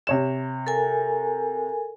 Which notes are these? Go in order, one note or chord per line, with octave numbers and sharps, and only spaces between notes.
C3 C#5 E7
A4 A#4 G#5